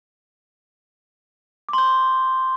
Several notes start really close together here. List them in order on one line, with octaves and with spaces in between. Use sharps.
D6 C6 G6